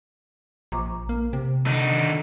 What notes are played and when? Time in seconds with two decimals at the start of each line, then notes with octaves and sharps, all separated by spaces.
0.72 A#1 A#5 C#6 D6
1.09 A#3
1.33 C3
1.67 D3 D#3 D#4